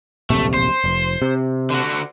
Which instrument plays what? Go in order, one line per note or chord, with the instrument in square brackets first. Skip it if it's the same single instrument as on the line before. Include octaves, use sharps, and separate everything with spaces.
[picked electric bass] D1 A#1 C3 [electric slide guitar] A3
[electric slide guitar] C5
[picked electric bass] F1
C3
[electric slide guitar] D3 F#4